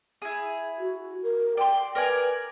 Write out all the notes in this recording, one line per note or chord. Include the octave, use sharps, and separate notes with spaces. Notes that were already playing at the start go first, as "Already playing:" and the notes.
E4 G#4
F#4
A#4
D5 G5 C6
A#4 B4 D5 G#5